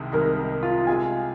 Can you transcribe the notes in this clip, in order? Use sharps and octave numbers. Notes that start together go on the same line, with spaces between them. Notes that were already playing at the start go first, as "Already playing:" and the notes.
Already playing: C2 C3 D#3 G#3 D#4
C2 C3 D#3 G#3 D#4 A#4
F4
C3 G#3 F4 G#4 G#5